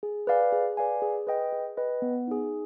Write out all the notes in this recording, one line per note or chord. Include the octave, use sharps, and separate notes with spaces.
G#4
B4 D5 F5 G#5
G#4
B4 D5 F5 G#5
G#4
B4 D#5 G5
G#4
B4 D#5 G5
B3
D#4 G#4